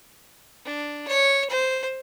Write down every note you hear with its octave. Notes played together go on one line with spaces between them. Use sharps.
D4
C#5
C5